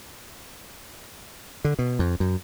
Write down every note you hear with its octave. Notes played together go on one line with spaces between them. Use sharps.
D3
B2
F2
F#2